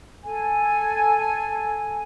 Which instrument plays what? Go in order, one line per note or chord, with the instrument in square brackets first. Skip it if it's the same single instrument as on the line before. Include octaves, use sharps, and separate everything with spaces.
[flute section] A4 G#5